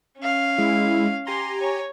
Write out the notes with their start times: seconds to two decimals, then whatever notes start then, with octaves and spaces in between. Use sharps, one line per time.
0.19 C#4 F5
0.58 G#3 E4
1.27 G4 G#5 A#5 C6
1.61 C#5